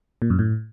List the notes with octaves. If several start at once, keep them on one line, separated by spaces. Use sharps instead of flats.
A#2
F#2
A2